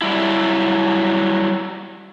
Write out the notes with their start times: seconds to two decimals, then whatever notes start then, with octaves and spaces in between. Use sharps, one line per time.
0.02 F#3 G3 E4